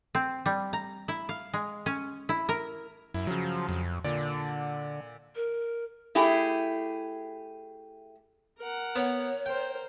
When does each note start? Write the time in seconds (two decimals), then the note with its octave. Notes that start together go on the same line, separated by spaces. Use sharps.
0.15 C4
0.46 G3
0.73 A#5
1.08 E4
1.29 F5
1.54 G#3
1.86 C#4
2.29 E4
2.49 A#4
3.14 F#2 E4
3.27 C#3 F3 F#3
3.69 F2
4.04 A#2 D3 D5
5.36 A#4
6.15 A3 E4 G4 G#4
8.59 A#4 F#5
8.96 B3 C#5
9.46 A#4 C5 G5